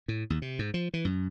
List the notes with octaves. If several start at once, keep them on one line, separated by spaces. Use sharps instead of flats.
A2
D#2
C3
G#2
F3
E3
F#2